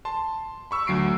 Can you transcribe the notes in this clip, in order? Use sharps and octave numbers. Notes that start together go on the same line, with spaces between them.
A5 C6
B5 C#6 E6
D2 F#3 C7 D7